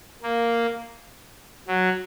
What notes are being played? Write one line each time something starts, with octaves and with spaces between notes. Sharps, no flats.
A#3
F#3